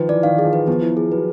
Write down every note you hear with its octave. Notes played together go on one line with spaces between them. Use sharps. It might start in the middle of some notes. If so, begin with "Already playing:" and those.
Already playing: D#3 F3 B4
E3 D5
D#3 F5
G#4
F3
B4
F3 B3
E4
G#4
F#3 B4